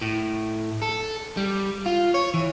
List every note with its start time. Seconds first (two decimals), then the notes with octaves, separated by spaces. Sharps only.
0.01 A2
0.83 A4
1.37 G3
1.86 F4
2.14 C#5
2.34 E3